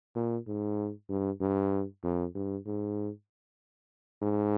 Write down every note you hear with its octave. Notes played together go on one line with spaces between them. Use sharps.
A#2
G#2
G2
G2
F2
G2
G#2
G#2